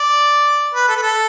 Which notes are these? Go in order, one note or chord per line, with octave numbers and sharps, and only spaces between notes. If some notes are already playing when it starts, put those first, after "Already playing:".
Already playing: D5
B4
A4
B4
A4